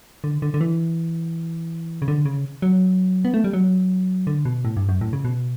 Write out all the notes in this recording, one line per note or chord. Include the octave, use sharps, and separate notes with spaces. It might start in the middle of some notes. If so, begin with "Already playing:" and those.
D3
D3
D3
E3
C#3
D3
C#3
F#3
B3
A3
G3
F#3
D3
B2
A2
G2
F#2
A2
C#3
B2